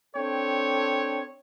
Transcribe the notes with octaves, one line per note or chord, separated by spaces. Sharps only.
C4 D4 A4 C#5 G5